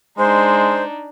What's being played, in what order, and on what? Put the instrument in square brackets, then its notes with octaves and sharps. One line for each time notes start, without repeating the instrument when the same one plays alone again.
[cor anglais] G#3 [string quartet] D4 D#4 [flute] C5